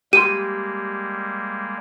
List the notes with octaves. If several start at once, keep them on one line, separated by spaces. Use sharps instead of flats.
G3 G#3 A#3 G4 G5 C6 D#7